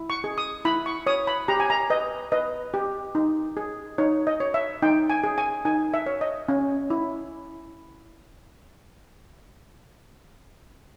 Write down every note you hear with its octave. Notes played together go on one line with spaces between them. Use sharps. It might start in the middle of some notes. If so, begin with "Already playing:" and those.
Already playing: E4
C#6
G#4
D#6
E4 B5
C#6
C#5 D#6
B5
G4 A#5
G#5
A#5
B4 D#5
B4 D#5
G4
D#4
G#4
D#4 C#5
D#5
C#5
E5
D#4 G5
G#5
G#4
G#5
D#4 G#5
E5
C#5
D#5
C#4
E4